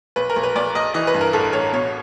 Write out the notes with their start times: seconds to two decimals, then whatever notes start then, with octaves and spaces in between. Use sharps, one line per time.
0.16 B1 B4
0.30 A#4
0.36 B1
0.43 B4
0.56 B1 D5
0.75 B1 D#5
0.94 E3 D#5
1.07 B4
1.14 G2
1.21 A#4
1.33 A1 A4
1.53 A1 C#5
1.73 B2 C#5